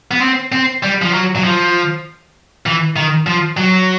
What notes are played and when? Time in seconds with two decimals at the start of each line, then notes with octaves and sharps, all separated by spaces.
0.11 B3
0.21 C4
0.52 C4
0.83 G3
1.02 F3
1.13 F#3
1.36 F#3
1.44 F3
2.66 E3
2.96 D#3
3.27 F3
3.57 F#3